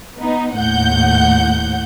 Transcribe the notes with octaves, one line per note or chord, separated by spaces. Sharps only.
B3 D#4
D#2 A2 F#5 G6